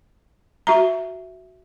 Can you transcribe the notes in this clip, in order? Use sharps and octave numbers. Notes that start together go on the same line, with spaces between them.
F#4 E5 A#5